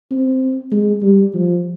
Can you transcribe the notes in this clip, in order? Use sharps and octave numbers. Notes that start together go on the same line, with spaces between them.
C4
G#3
G3
F3